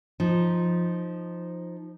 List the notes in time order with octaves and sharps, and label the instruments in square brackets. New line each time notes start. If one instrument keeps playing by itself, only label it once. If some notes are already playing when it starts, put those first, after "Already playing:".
[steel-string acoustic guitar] F3 D#4